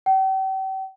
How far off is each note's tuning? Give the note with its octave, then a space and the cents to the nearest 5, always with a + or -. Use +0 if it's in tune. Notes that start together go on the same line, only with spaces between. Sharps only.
G5 -40